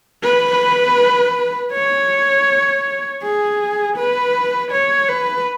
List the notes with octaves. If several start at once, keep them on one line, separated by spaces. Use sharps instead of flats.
B4
C#5
G#4
B4
C#5
B4